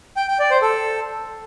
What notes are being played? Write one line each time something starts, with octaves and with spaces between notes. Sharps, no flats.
G5
G5
D5
C5
A4